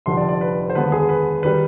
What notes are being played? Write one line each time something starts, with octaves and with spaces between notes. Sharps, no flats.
F1 F2 D3 G3 C6
D5
D5
B4
C5
D#2 D3 G#3 B3 B4
G#4
B4
D#3 G3 B4